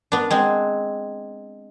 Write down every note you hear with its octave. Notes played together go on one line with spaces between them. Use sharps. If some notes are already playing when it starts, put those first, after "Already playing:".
B3 D4
G#3 C4